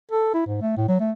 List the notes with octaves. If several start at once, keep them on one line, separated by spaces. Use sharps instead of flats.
A4
E4
G#2
A3
A2
F#3
A3